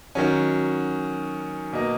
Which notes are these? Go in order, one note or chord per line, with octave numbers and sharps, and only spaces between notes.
D#3 F#3 C#4
B2 A#3 D#4